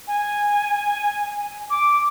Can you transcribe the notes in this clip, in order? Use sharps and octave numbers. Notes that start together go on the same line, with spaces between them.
G#5
D6